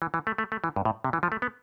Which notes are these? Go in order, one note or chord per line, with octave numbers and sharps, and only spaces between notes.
E3
E3
A3
A3
A3
E3
G2
A2
C3
E3
F3
A3
B3